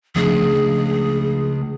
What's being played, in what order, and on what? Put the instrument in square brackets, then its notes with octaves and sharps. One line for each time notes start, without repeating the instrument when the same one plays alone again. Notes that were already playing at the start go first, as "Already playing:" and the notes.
[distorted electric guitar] C#2 [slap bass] F3 A3 D4 [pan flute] G#4